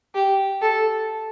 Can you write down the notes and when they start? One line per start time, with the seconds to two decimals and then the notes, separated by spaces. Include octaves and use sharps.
0.15 G4
0.62 A4